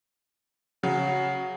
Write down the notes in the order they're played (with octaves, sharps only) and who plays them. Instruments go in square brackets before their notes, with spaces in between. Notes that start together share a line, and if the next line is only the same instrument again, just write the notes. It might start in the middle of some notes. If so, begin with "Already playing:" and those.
[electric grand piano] C#3 [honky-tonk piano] F#3 [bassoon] F#4